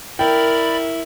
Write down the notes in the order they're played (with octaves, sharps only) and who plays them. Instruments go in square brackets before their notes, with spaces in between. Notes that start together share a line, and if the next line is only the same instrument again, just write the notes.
[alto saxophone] E4 [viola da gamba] A#4 [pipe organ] D5 B5 [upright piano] G5